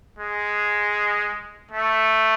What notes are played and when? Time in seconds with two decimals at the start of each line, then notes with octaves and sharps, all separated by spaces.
0.19 G#3
1.71 A3